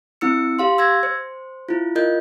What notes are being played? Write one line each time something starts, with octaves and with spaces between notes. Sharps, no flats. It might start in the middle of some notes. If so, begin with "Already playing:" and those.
C4 E4 E6 C#7
G4 F5 C6
E6 G#6 A#6
C5
E4 F4
F4 A#4 D#5 G6